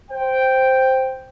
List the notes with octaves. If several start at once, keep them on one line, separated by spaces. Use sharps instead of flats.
C5 G5